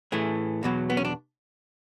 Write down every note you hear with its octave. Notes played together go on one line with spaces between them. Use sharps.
A2 E3 A3 G#4
E2 B2 F#3
B3
C#4
D4